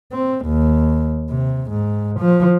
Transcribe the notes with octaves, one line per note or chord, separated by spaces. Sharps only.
C4
D#2
C3
G#2
F3